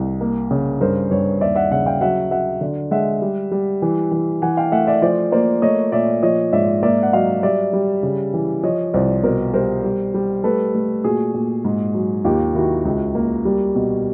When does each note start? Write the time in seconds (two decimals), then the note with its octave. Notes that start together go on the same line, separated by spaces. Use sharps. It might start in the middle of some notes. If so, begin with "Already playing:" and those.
Already playing: C2
0.21 A#3
0.51 C#3
0.81 G2 A#4 C5
1.11 G2 B4 C#5
1.41 D#2 D5 E5
1.56 E5 F#5
1.71 C#3 E5 F#5
1.86 F5 G5
2.01 F#3 E5 F#5
2.31 F#3 E5 F#5
2.61 D3
2.91 G#3 E5 F#5
3.22 G3
3.52 G3
3.82 E3
4.11 E3
4.42 E3 F#5 G#5
4.57 F5 G5
4.72 A3 E5 F#5
4.87 D5 E5
5.02 F3 C5 D5
5.32 A#3 C5 D5
5.62 A3 C#5 D#5
5.92 A#2 D5 E5
6.22 F3 C#5 D#5
6.53 G#2 D5 E5
6.83 A#3 D5 E5
7.03 F#5
7.13 F#3 D#5 F5
7.43 G3 D5 E5
7.73 G3
8.03 C#3
8.34 E3
8.63 F3 C#5 D#5
8.94 C2 C5 D5
9.24 B2 A#4 C5
9.53 G3 A#4 C5
9.84 G3
10.14 G3
10.44 A3 A4 B4
10.75 A3
11.04 A#2 F#4 G#4
11.34 A#2
11.65 G#2
11.94 F#3
12.25 D#2 F4 G4
12.54 D#3 E4 F#4
12.85 C#2
13.15 A#3
13.45 G3
13.75 B2